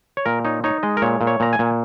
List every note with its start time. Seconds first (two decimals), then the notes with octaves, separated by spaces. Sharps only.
0.17 C#5
0.26 A#2 A#4
0.45 D#4 C#5
0.64 D#4 C#5
0.83 G#3 D#5
0.97 A#4
1.02 A#2 C#5
1.21 A#2
1.27 C#5
1.40 A#2 A#5
1.53 G#5
1.59 A#2